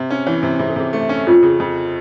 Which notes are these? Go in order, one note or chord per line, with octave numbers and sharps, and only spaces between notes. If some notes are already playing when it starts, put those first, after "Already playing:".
Already playing: C3
C#4
E3 C#5
C3
C3 G#4
A4
C3 G#4
A3
C#4
F2 F4
C#3
F2